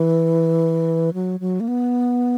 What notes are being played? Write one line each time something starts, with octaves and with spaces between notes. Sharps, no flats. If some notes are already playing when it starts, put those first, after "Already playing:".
Already playing: E3
F#3
F#3
A#3
B3